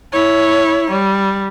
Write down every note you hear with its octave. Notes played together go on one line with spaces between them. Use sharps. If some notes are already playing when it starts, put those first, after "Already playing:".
E4 C#5
G3